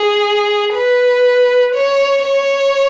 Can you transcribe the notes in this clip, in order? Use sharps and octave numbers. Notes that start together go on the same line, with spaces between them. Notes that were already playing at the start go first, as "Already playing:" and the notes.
Already playing: G#4
B4
C#5
C#5